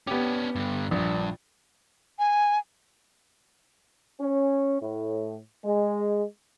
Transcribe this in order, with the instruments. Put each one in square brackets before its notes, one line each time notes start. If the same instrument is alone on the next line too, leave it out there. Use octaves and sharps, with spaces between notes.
[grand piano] B3 G4 [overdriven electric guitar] C#4 D4
[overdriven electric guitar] G2 D3
[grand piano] A#1 [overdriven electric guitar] E2 G2
[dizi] G#5
[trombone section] C#4
A2
G#3